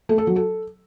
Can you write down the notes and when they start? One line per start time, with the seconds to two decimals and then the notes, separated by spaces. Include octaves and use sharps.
0.09 A3
0.18 A4
0.27 F#3
0.36 A4